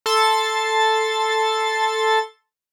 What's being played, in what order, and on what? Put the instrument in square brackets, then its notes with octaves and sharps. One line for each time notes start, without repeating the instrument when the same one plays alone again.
[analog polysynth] A4 C6 A6